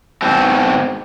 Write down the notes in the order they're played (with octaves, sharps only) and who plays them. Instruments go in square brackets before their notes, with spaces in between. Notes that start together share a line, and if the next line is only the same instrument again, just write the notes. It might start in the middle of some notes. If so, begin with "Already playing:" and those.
[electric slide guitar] G#2 B2 C4